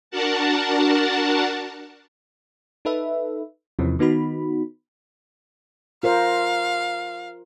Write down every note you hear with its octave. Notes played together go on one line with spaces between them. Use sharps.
D4 F#4 A#4 F#5 A5
D#4 A4 B4 E5
E2 C3 E3 F3 C4 C#4
D#3 B3 D#4 F#4 B5
F4 A#4 C5 F5